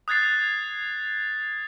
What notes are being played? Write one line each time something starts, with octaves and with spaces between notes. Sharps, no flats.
D#6 F#6 G#6 A6 C7